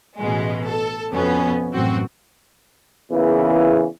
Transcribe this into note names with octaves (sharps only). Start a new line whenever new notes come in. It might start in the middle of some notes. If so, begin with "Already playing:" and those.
A1 B2 G#3
A4
F2 B2 B3 C#4
A1 F#2 C4 F#4
E2 A#2 C#3 E3